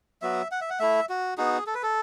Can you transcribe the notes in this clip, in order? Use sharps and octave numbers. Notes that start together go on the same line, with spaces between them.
F#3 B3 F#4 E5
F#5
E5
F#5
A3 E4 E5
F#4
B3 D#4 F#4 G#4
A4
B4
A4